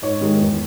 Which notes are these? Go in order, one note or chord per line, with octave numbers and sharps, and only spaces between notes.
G#2 C#5
D#3 G#3
E2